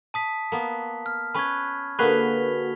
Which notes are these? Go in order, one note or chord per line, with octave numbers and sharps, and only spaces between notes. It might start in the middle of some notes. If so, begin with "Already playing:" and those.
A5 D#6 B6
A#3 B3
F6
C#4 B4 B5 C#6 G#6
D3 A#3 F#4 G#4 B4 B6 F7 G7